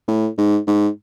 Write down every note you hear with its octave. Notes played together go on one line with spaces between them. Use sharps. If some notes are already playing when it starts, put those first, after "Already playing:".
A2
G#2
G#2